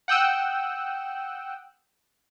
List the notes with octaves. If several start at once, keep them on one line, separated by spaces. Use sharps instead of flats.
F#5 G5 D#6 E6 F#6